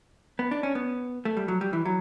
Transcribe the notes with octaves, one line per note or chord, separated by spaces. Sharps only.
B3
D4
C#4
B3
A3
G3
F#3
G3
E3
F#3